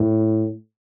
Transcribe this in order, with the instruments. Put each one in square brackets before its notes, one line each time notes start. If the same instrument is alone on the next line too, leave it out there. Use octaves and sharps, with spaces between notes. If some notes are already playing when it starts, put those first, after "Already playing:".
Already playing: [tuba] A2